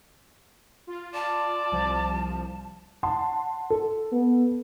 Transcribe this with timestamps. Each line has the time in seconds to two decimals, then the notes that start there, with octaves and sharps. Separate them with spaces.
0.87 F4
1.14 D5 A5
1.72 C2 F3
3.03 F#5 A5 C6
3.70 A4
4.12 B3